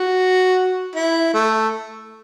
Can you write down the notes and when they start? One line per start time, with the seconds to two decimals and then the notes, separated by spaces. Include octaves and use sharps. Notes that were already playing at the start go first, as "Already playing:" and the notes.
Already playing: F#4
0.95 E4
1.34 A3